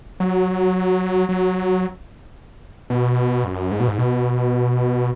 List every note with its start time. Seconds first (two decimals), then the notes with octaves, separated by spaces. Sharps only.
0.20 F#3
1.29 F#3
2.90 B2
3.44 F#2
3.71 G#2
3.80 B2
3.88 G#2
3.98 B2